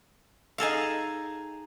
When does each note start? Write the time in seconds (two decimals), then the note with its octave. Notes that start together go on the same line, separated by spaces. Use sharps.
0.58 D#4 G#4 A4 F5